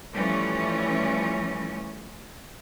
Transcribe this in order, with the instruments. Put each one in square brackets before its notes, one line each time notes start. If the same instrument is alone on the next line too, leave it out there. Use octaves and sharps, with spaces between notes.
[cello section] E3 F3 G3 A3 C#4